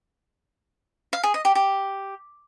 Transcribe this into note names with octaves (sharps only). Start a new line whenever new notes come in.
F5
G#4
D#5
G4
G4